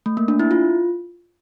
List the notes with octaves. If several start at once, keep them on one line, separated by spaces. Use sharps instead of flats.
A3
A#3
D4
E4
F4